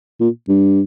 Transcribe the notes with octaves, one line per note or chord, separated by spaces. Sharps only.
A#2
G2